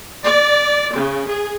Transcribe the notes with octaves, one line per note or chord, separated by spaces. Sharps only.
D5
C#3
G#4